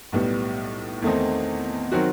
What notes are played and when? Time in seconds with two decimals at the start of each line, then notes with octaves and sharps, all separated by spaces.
0.12 B1 A2 G3 B3
1.02 E2 D#3 A3 C4 D#4
1.92 D#3 F#3 C4 F#4